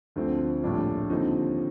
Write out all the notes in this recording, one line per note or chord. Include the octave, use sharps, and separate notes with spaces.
D2 D3 F3 C4
A#1 A2 G3 D4 F4
D#2 D3 F3 C4 D#4